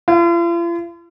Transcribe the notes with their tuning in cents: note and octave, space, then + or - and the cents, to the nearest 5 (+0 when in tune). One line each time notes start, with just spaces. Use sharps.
F4 -45